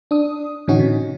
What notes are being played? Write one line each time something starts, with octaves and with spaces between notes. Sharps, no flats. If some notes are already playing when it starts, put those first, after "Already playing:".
D4 D#6
A2 D3 E3 C#4 D#4 F#4
C3